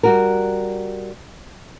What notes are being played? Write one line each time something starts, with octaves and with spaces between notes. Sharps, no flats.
G3 F#4 A#4